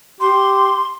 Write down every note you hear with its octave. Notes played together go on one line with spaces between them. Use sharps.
G4 C6